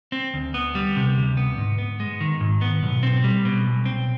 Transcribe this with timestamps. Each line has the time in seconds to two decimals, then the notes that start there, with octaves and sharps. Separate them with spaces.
0.12 C4
0.34 D2
0.54 B3
0.75 G3
0.96 C3
1.17 D2
1.37 B3
1.58 G#2
1.78 B3
2.00 G#3
2.21 D#3
2.41 G#2
2.61 B3
2.83 B1
3.03 C4
3.24 G3
3.45 B2
3.66 B1
3.86 C4